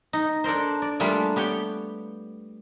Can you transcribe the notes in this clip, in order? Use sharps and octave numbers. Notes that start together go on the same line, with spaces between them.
D#4
D4 A4 A#4 C5
D5
G3 A3 A#3 D4 F4 G#4
B3 G4 C#5 G5